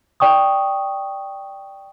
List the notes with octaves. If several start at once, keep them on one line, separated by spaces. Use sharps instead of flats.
D5 G5 C#6 D#6